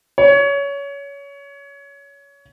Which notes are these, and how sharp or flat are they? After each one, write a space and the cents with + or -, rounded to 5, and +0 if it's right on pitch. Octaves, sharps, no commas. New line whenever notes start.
C#5 +20